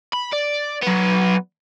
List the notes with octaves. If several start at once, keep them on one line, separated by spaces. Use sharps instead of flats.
B5
D5
F#3 B3